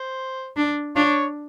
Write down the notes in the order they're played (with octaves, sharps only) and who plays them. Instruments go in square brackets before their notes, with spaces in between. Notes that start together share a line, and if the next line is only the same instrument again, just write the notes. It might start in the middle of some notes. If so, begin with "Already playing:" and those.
Already playing: [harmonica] C5
[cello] D4
[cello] D4 [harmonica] F4 C#5